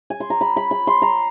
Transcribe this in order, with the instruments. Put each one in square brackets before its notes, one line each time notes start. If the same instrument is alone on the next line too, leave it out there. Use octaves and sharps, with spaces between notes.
[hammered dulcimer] G#5
C6
A#5
B5
B5
B5
C6
A#5